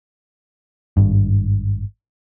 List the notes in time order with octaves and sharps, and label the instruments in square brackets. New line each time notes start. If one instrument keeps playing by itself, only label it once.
[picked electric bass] G#1 G2